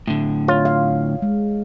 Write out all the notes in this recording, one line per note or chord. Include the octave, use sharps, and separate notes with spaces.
A2 D3
F4 C#5
F5
G#3